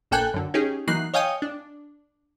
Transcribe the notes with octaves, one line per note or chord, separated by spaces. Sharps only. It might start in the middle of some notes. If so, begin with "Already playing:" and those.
A#1 A#3 A4 G5 G#5 F#6
F#2 D3
C#4 D#4 G4 G#4
E3 F#3 A#3 D#4 F#6 C7
C#5 D#5 F5 G5 G#5 D#6
D4